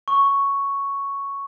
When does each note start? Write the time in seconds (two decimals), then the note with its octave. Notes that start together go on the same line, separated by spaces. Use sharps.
0.08 C#6